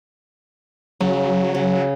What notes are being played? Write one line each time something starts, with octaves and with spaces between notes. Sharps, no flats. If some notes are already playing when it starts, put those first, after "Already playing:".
C#3 F#3
C#3